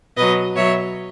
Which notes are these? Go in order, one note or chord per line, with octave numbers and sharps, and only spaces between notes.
B2 F#3 B4 D#5
B2 F#3 C#5 E5